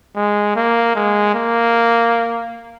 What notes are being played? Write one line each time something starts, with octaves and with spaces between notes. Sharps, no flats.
G#3
A#3
G#3
A#3